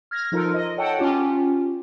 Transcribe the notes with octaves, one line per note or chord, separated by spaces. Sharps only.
F6 G#6 A#6
F3 D#4 F4 A4 A#4
D#5
A4 C#5 F#5 G5 A5
C#4 F4 G4